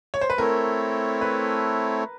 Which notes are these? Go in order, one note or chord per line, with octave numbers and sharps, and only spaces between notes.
C#5
C5
B4
A3 C4 E4 A4 A#4 C#5
B4